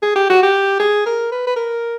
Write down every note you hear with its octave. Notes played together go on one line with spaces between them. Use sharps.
G#4
G4
F#4
G4
G#4
A#4
B4
B4
A#4